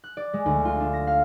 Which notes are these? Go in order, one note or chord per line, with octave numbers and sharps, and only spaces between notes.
F#6
D5
G#3
D2
F4
D4
A#6
F5